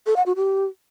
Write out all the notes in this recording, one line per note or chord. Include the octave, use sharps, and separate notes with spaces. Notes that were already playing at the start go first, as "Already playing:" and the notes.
A4
F#5
F#4
G4